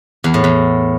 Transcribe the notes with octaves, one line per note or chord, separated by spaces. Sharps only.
E2
A2
E2